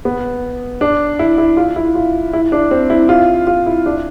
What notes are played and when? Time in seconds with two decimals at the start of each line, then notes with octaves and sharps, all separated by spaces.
0.05 B3
0.81 D4
1.19 E4
1.38 E4
1.57 F4
1.76 E4
1.95 F4
2.33 E4
2.52 D4
2.71 C4
2.90 E4
3.09 F4
3.47 F4
3.66 E4
3.86 D4